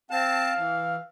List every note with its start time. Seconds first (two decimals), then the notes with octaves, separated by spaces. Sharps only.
0.11 C4 F5 A5
0.56 E3